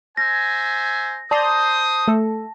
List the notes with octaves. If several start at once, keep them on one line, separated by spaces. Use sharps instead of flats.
C5 E5 G#5 A#6
C5 D5 A5 A#5 C6 D#6
A3 A4